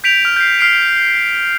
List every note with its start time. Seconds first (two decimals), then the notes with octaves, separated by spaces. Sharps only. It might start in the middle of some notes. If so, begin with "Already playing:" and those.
0.04 G6 B6 D7 F7
0.25 F6
0.36 G6 C7
0.59 F6 C7 D7